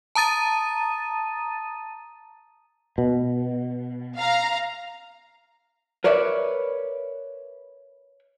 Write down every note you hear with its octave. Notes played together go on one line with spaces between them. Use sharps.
A5 A#5 D#6 A6 D#7
B2
F5 A#5
A#4 B4 C#5 D5 E5